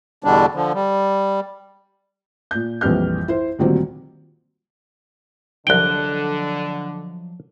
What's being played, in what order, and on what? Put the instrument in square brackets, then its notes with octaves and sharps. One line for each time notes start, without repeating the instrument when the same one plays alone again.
[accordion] E2 B2 D3 G3 D4
D3 F3
G3
[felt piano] A#2 G6
A#1 F2 E3 G3 F6 G6
E4 C5
D2 A#2 D#3 F#3 G3 C4
[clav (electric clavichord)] C2 G5 [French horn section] D3 [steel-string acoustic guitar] F3 F#3 D#5 [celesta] F#6 G7